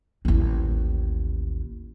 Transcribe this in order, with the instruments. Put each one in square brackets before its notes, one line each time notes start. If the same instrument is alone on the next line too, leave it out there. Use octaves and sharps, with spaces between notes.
[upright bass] A1 D#2